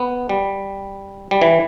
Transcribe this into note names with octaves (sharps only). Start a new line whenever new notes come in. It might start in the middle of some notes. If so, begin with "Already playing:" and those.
Already playing: B3
G3
G3
E3